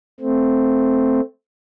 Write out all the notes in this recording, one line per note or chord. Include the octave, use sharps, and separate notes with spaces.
A3 C4